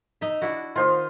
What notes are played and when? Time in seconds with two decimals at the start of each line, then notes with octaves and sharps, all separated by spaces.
0.21 D#4 E5
0.42 D4 E4 F#4
0.76 D#3 F4 C5 D#5